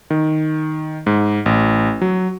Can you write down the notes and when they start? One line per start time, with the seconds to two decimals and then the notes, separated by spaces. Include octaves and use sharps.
0.10 D#3
1.06 G#2
1.46 A1
2.01 F#3